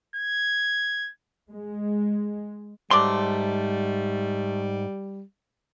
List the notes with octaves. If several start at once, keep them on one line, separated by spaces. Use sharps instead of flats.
G#6
G#3
G#2 F#3 G3 A3 D5 C6